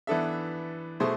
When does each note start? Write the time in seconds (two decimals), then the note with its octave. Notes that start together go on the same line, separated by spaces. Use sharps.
0.07 E3 B3 D4 A4 E5
1.00 B2 A3 E4 G#4 C5